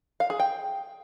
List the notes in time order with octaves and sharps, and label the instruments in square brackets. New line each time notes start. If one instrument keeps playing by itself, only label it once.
[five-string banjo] F5
G#4
G5